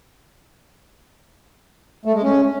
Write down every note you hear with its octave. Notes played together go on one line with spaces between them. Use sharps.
A3
G#3
C#4